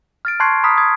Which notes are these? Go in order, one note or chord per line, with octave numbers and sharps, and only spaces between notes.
F6 A6 D7
A5 C6 C#6 F#6 G#6 C7
A#5 B5 D#6 F6 B6
D#6 G#6